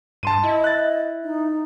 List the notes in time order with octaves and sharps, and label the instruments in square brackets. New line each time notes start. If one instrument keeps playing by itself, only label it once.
[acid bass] G2 [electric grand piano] A5 C6 D#7
[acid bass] E4 [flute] D#5
[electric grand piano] F#6 A6
[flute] D#4